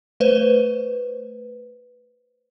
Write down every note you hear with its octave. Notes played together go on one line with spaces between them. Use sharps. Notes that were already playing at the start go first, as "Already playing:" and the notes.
A3 B4 C5